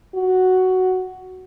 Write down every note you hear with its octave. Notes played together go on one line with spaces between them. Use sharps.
F#4